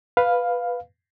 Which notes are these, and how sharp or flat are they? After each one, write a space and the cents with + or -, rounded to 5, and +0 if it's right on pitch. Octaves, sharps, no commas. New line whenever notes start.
B4 +0 F5 +5